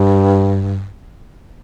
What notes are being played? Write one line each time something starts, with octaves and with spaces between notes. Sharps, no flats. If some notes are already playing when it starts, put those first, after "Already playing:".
Already playing: G2